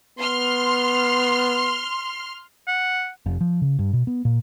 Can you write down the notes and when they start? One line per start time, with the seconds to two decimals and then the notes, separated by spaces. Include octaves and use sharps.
0.19 B3 C6 F6
2.67 F#5
3.26 F1
3.41 F3
3.62 C#3
3.79 G2
3.93 B2
4.07 B3
4.25 A#2